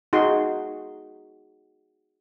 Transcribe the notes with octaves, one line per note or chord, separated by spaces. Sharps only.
D#4 F#4 G#4 C6